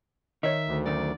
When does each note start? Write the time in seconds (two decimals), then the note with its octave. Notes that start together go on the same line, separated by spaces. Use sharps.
0.43 D#3 C#5 D#5 E5
0.67 D2
0.86 F#2 D#3 D5